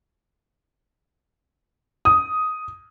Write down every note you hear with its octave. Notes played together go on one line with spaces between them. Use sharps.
D#6